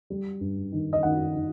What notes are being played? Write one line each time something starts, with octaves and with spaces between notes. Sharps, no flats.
G3
G2
D#3
D#5
D#3 F#5
D#3